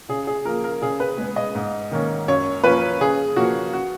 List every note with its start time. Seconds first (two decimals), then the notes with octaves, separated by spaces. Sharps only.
0.09 C#3 G#4
0.27 G#4
0.45 F3 A#3 A#4
0.64 A#4
0.81 C#3 G#4
1.00 B4
1.18 G#3 B3
1.36 D#5
1.55 G#2
1.91 D#3 A#3 C#4
2.28 F#2 C#5
2.64 F3 A#3 C#4 B4
3.00 C#3 G#4
3.36 F3 A#3 C#4 F#4
3.73 F#4